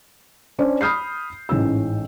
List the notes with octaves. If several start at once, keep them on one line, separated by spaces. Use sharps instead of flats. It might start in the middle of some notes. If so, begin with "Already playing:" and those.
C#4 D4 C5 D5
B5 D#6 F6 G6 C7
A1 G#2 C#4 E6